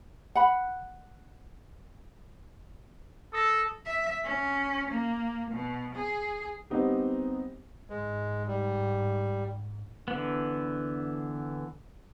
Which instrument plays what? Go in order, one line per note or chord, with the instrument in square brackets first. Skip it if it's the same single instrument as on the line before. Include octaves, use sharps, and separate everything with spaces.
[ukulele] F#5 B5
[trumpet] A4 [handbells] D#6 A#6
[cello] E5
C#4
A#3
B2
G#4
[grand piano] G3 B3 C4 D#4 G4
[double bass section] G#2 [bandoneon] G#3
[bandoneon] G3
[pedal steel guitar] D3 E3 B3